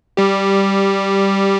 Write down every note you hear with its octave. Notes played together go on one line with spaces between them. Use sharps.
G3 G4